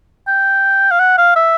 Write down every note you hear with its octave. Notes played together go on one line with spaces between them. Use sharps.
G5
F5
F#5
F5
E5